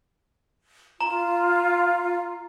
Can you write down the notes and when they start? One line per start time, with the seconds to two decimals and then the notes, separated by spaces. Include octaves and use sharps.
1.01 F4 A#5